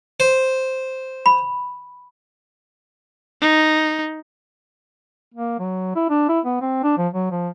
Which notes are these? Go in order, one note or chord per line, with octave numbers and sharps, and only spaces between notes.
C5
B5
D#4
A#3
F#3
E4
D4
E4
B3
C4
D4
F3
F#3
F3